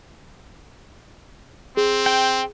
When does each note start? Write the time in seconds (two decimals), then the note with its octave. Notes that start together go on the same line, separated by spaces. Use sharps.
1.77 C4 G#4
2.06 G5